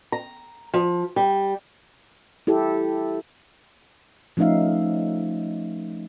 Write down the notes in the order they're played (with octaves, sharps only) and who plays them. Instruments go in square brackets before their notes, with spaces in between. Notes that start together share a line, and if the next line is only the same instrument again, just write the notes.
[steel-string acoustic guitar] A#5
F3
G3
[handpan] E4 G4 A4
F3 A3 C#4 D#4 E5 F5